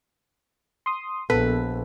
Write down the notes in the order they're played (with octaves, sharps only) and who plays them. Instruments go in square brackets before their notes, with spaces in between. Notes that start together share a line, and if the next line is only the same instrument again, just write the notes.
[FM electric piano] C6 D#6
[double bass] A#1 [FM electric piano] B3 A4 [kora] B4